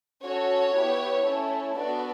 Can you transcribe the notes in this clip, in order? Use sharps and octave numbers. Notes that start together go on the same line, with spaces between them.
C#4 F#4 A4 C#5
B3 E4 G4
A3 C#4 E4 A4
B3 D4 F#4 A4 D5